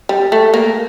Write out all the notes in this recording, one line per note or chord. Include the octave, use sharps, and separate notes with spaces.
G3
A3
A#3